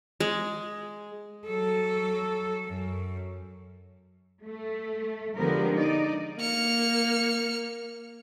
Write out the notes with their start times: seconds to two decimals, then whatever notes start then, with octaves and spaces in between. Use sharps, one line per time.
0.20 G#3
1.47 F#3 A4
2.66 F#2
4.44 A3
5.36 D3 F3 G#3 B3 G4 A#4
5.75 D#4 D5 D#5
6.40 A#3 F6 C#7